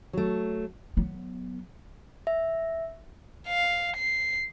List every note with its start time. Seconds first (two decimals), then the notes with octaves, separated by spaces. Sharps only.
0.13 F#3 A3
0.97 F#3 B3
2.27 E5
3.48 F5
3.97 C7